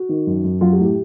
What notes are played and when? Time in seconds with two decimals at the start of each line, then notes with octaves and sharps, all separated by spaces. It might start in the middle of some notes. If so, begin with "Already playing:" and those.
Already playing: F#4
0.09 D#3
0.27 F#2
0.44 F#2
0.61 F#3 F4
0.73 G4
0.79 A2
0.84 G4